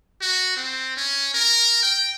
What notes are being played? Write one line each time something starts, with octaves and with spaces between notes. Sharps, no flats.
F#4
C4
C#4
A#4
G5